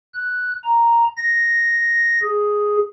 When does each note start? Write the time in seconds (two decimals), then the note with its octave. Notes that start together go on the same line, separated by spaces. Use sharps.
0.14 F#6
0.64 A#5
1.17 A#6
2.23 G#4